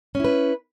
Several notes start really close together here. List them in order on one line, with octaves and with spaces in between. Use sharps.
C#4 E4 B4